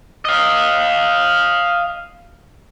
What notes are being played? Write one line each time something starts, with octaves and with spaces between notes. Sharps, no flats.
D#5 F5